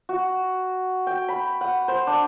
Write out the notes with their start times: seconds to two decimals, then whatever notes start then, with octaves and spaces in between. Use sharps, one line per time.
0.09 F#4
1.07 G5
1.28 B5
1.61 F#5
1.88 C5
2.07 D4